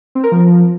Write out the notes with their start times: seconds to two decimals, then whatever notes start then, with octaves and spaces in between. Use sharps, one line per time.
0.15 C4
0.23 A#4
0.32 F3